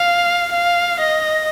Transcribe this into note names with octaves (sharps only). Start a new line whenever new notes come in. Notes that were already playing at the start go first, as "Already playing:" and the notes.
Already playing: F5
F5
D#5